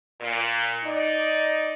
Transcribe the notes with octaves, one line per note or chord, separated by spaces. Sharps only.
A#2
D#4 D5